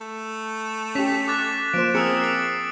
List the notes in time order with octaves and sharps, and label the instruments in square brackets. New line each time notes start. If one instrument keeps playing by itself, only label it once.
[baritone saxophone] A3
[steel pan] C#4 G4 [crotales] C#6 B6 F7
[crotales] D6 F#6 A6
[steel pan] F3 A#3 C5 [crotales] D7 E7
[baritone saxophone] A#3 [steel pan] C4 G#4 [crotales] D#6 E6 C#7
[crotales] A6 C7 D7